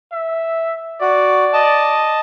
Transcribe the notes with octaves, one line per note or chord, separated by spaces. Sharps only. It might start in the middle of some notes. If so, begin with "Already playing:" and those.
E5
F#4 D5
D#5 A5